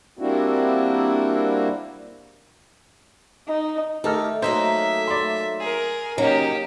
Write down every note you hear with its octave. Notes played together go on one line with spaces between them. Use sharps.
G3 A#3 C4 D4 E4 F#4
D#4
D#3 A3 D#4 G4 A4 F6
F#3 A#3 D#4 C5 E5
D5 C6
G#4 A#4
C#3 F#3 A#3 C#4 D#4 G4